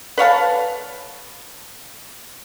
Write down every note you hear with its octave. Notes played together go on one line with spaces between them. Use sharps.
B4 C#5 F5 A5